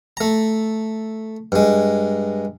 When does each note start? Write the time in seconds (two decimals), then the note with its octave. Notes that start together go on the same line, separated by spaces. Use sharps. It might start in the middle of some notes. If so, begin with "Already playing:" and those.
0.17 A3 A#5
1.52 G2 G#3